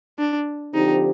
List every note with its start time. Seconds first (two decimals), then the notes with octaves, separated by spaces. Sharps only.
0.19 D4
0.74 D3 F3 C4 D#4 G4